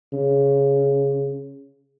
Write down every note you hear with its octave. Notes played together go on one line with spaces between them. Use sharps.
C#3